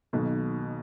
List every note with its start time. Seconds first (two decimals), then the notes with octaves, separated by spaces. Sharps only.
0.13 B1 B2 D#3 F#3 A#3 D#4